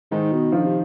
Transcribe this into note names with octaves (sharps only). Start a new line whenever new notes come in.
G#2 D#3 D#4
B2
D3 F3 F4
C3